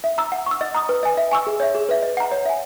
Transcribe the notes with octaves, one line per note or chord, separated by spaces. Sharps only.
E5
A#5 E6
F#5
C#6 E6
D#5
A#5 D#6
B4
D#5 G#5
E5
G#5 C#6 E6
G#4
C#5 E5
G#4
B4 E5
D#5
F#5 A#5
C#5
E5 G#5